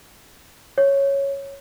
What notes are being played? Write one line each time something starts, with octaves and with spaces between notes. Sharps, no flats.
C#5